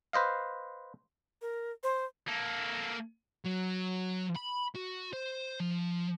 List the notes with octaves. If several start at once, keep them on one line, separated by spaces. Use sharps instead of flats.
B4 C5 D#5 F5
A#4
C5
A#3 A4
F#3
B5
F#4
C5
F3